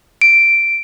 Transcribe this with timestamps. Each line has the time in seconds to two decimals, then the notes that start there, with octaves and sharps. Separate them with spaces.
0.21 D7